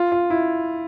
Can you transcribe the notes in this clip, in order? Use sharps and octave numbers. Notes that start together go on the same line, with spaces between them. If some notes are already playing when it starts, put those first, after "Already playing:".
Already playing: F4
F4
E4